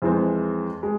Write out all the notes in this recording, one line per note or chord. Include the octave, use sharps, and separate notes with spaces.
F2 E3 G#3 C4
G#3